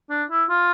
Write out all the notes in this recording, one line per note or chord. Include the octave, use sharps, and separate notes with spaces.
D4
E4
F4